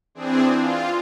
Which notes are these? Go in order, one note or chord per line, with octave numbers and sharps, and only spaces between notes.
E3 C4 D4 G#4
F4